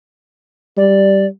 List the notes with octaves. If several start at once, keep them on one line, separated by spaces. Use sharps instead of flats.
G3 D5